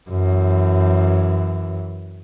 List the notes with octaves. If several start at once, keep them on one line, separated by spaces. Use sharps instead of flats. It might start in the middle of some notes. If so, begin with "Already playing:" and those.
F#2 E3